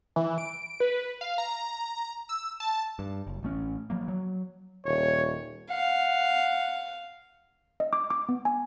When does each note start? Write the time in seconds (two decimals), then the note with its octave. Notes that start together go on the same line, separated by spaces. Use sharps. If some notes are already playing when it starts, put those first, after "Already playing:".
0.16 E3
0.38 D7
0.80 B4
1.21 F5
1.38 A#5
2.29 E6
2.60 A5
2.99 G2
3.27 F#1
3.43 A1 A3 C#4
3.90 F3 F#3 A#3
4.08 F#3
4.85 D#1 C#5
5.70 F5 F#5
7.80 D#5
7.93 D6
8.10 D6
8.29 B3
8.45 G#5